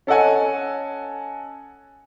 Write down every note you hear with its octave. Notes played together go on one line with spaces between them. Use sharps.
C#4 A4 D#5 F#5 G#5